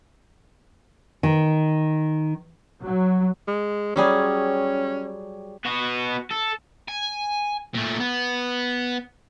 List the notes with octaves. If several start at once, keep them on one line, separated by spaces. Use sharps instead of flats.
D#3
F#3
G#3
F#3 G3 C#4 G#4
B3 F#4
A4
G#5
A#2 A3
B3